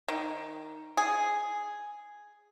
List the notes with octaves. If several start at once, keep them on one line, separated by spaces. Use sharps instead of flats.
D#3
G#4